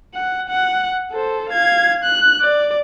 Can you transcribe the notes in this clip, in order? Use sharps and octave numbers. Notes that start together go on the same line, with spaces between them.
F#5
F#5
A4 C5
F5 G#6
F#6
D5